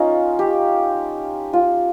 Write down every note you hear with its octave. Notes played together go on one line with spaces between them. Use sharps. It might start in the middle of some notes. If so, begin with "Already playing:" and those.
Already playing: C#4 D#4 F4
G4
F4